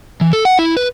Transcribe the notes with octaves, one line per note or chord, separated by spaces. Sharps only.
E3
A4
F#5
E4
B4